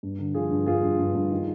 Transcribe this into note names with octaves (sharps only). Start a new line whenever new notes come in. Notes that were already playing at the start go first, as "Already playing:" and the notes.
G2
D3
F3 F4 G#4
G2
G2 F4 G#4
G2
G2
G2
D#3